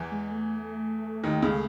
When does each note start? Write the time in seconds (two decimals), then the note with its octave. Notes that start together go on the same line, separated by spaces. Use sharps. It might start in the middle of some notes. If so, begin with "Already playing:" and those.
Already playing: E2 E3
0.12 G#3
0.31 A3
1.24 D#2 D#3
1.42 C#2 C#3